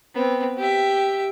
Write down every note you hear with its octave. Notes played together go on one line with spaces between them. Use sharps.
B3 C4
G4 E5